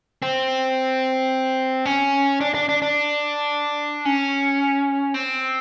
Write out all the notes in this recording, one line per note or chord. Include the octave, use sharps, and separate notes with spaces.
C4
C#4
D4
D4
D4
D4
C#4
C4